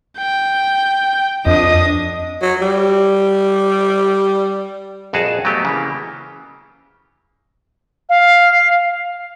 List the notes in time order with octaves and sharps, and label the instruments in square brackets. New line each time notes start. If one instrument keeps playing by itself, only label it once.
[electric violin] G5
[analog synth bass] F2 [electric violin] D4 D#6 [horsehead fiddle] D#5
[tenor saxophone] F#3
G3
[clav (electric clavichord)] A#1 F2 F#4 G#4 A5
F#3 A3 B3 G4
C#3 E3 A#3
[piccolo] F5